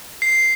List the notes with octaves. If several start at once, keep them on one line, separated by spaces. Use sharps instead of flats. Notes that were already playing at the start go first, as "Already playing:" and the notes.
C7